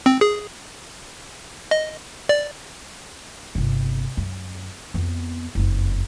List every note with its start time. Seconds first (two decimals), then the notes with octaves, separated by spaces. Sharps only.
0.06 C4
0.21 G#4
1.71 D#5
2.29 D5
3.55 G1 C3
4.17 F#2
4.94 F2 B3
5.55 F#1 F2